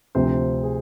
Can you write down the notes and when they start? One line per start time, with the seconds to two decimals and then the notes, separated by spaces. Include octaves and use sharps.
0.15 D2 C3 F3 C4 C5
0.63 G#4